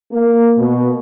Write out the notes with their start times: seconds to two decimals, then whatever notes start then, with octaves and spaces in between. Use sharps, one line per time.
0.12 A#3
0.57 B2